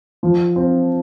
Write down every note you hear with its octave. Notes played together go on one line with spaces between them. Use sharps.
F3
C4